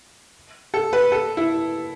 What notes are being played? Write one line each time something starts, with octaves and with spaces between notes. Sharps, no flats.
A4
B4
A4
E4